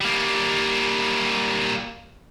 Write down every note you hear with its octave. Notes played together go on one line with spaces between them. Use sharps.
G3 A#3